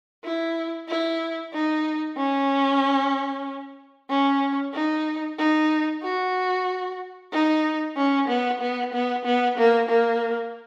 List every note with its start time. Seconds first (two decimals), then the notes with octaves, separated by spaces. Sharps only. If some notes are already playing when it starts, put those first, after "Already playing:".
0.24 E4
0.88 E4
1.53 D#4
2.17 C#4
4.10 C#4
4.74 D#4
5.38 D#4
6.03 F#4
7.32 D#4
7.96 C#4
8.28 B3
8.61 B3
8.93 B3
9.25 B3
9.57 A#3
9.89 A#3